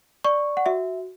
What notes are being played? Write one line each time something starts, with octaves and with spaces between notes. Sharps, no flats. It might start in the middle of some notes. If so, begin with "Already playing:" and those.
D5 C#6
F#5
F#4 E5